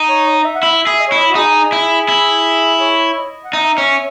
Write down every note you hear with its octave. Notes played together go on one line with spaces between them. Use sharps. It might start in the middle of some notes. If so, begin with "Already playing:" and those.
Already playing: D#4
C#5
D#5
E5
F#5
E4 E5
G#4
D#5
C#5
E4 D#5
F#4
D#4 G#4
E4
E4
C#5
D#5
F#5
D#4 E5
C#4